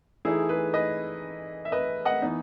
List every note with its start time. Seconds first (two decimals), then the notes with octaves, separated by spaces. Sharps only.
0.25 E3 A3 D#4 E4 G#4
0.49 G#4 B4
0.74 B4 D#5
1.65 E5
1.72 B4 D#5
2.05 D#5 F#5
2.22 E3 B3 D#4